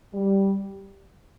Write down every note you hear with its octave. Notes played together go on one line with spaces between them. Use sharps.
G3